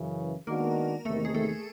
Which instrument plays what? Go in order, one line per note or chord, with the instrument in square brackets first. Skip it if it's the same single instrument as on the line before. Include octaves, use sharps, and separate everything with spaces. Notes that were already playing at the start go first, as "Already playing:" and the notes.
Already playing: [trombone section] F#2 C#3 E3
[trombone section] D#3 G#3 B3 D4 F#4 [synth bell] A#3 A#4
[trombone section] E2 C3 D#3 [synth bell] A3 A4
[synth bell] G#4
A3 A4